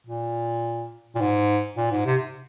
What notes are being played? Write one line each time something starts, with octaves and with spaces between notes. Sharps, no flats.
A#2
A#2
G#2
A#2
G#2
C3